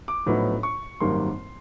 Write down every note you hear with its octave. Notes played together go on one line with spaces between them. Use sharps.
D6
A#1 A2 F#3 B3 D#4
C#6
G#1 F#2 D#3 G3 A#3 C6